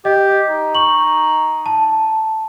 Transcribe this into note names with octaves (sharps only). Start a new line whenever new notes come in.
G4 D#5
D#4
C#6 F#7
A5